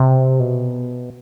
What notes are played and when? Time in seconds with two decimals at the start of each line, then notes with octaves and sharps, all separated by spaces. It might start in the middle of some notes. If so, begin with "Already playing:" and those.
Already playing: C3
0.40 B2